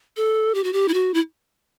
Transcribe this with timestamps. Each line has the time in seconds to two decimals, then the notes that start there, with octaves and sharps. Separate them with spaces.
0.17 A4
0.55 G4
0.64 F#4
0.73 G4
0.88 E4
0.94 F#4
1.14 E4